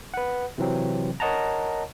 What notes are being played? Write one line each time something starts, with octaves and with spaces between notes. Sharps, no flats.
B4 F#5
C3 E3 F#3 C4
A#4 C#5 D#5 F#5 A5 A#5